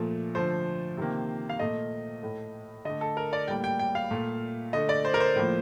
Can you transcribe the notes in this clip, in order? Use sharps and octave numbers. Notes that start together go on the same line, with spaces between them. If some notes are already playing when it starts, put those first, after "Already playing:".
Already playing: A#2 F3 A3
D3 F3 A3 C5
C3 D#3 A#3
F5
A#2 A3 D#5
A2 A3
D3 A3 D#5
A4
A#4
D5
A2 G3 A#3 G5
G5
G5
F5
A#2 A3
D3 A3 D#5
D5
C5
A#4
C5
A2 F3 A#3